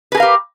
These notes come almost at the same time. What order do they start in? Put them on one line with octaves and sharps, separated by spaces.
B4 G#4 A#4 F5 G4